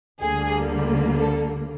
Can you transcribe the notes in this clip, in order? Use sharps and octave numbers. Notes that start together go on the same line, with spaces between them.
D2 D3 G3 A#3 G#4
A4